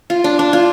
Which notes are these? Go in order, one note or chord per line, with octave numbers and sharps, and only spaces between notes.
F4
D4
D4
F4